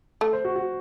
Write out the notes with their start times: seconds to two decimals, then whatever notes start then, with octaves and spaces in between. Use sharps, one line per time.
0.21 A3
0.33 C5
0.45 F#4
0.56 F#4